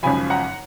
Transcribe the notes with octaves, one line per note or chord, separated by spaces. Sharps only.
G#1 F#2 C#3 F3 G#5 B5
F#5 A#5